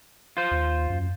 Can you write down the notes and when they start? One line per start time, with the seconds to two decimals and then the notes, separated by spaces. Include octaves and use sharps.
0.37 F4 C5
0.51 D#2
0.90 F#2